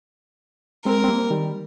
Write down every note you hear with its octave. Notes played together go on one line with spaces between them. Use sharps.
G#3 C4 A#4
C4
G3 A#3
D#3 G3